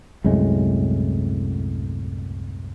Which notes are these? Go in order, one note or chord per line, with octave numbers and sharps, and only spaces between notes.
C2 F#2 A2 G#3